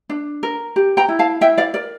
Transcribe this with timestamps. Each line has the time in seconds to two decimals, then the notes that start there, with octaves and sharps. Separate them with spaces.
0.09 D4
0.43 A#4
0.76 G4
0.97 G5 A#5
1.09 E4
1.19 F5 A5
1.41 E4 E5 G5
1.58 D5 F5
1.74 A#4 D5